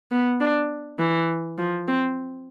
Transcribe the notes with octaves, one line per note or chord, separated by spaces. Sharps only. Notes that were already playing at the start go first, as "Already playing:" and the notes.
B3
D4
E3
F3
C4